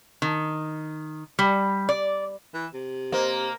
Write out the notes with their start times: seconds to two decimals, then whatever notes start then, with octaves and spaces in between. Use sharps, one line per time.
0.22 D#3
1.39 G3
1.89 D5
2.54 E3
2.74 C3
3.12 A#3 C5 D#5